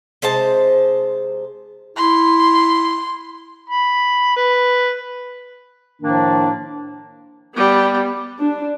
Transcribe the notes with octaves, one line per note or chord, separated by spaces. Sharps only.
C3 G#3 C5 A5
E4 C6
B5
B4
A2 D#3 F3 A#3 D4
G3 B3
D4